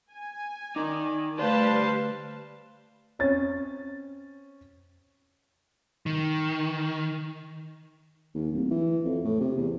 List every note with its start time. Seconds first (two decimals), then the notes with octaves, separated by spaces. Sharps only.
0.13 G#5
0.76 D#4 A#4 D5
1.39 D3 A3 G4 B4 C5 D5 F5 A5
3.19 C4 C#4 A6
6.06 D#3
8.35 D#2
8.52 D1
8.71 E3
9.05 F2
9.25 A2
9.41 C3
9.58 E2